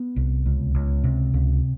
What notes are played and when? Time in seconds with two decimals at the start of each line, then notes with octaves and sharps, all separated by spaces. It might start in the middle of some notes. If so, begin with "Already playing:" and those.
Already playing: B3
0.16 C2
0.46 C#2
0.74 C#2
1.04 C3
1.34 C#2